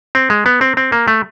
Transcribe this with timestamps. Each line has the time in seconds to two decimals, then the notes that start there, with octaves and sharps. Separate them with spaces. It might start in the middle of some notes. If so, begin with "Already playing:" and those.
0.15 C4
0.30 G#3
0.46 B3
0.61 C4
0.77 C4
0.92 A#3
1.08 A3